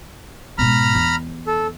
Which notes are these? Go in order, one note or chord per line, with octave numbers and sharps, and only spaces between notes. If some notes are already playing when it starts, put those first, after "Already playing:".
G#2 B2 A#5 B5 F6
E2
A4